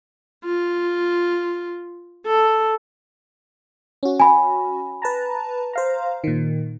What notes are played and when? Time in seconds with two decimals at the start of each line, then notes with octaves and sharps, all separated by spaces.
0.45 F4
2.27 A4
4.03 C#4 F#4
4.20 G#5 B5
5.02 B4 A5 A#5
5.73 C5 F5 A#5
6.24 A#2 D#3